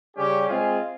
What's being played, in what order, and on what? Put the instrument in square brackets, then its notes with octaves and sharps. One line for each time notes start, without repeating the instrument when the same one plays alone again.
[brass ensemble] C#3 G3 C#4 G4
G#3 C4 F4 G#4